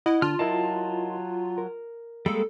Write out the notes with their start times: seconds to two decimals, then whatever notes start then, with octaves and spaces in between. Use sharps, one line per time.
0.06 E4 D#5 F#5
0.22 D3 D4 F4 A5 F6
0.39 F#3 E4 A#4 D#5 F5 A5
1.58 A#4
2.26 G3 G#3 A#3 A4